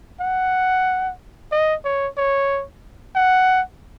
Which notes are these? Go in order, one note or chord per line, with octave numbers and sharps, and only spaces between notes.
F#5
D#5
C#5
C#5
F#5